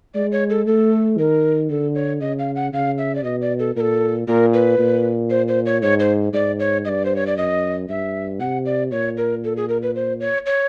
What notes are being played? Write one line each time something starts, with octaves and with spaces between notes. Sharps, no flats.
G#3 D5
C#5
A4
A3 A4
D#3 A#4
D3 A4
C#5
C#3 D#5
F5
F#5
C#3 F5
E5
D5
B2 D#5
D5
A4
A#2 A4 A#4
A#2 A#4
B4
A#2
C5
C5
C#5
G#2 C#5
C5
G#2 D5
C#5
G2 D5 D#5
C5
C#5
D5
F#2 D#5
G2 E5
C3 F#5
D5
A#2 C#5
A#4
A4
G#4
A#4
B4
C5
C#5
C#5